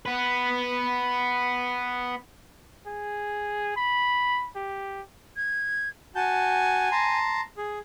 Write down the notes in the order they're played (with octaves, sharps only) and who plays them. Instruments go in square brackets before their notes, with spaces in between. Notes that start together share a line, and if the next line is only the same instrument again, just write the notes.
[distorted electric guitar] B3 B4
[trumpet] G#4
B5
G4
[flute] G#6
[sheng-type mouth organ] F#4 A5 G6 [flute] G#5
[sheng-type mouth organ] A5 A#5 C6
G#4